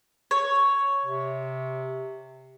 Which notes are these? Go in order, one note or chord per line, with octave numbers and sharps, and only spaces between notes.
C#5
C3